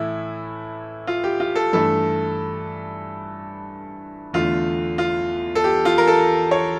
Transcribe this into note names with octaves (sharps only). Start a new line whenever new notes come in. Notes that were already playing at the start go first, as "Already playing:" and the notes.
Already playing: A2 E3 A3 E4
F4
G4
F4
A4
G2 E3 A3 A4
E2 D3 A3 F4
F4
A4
G4
F4
A#4
A4
C#5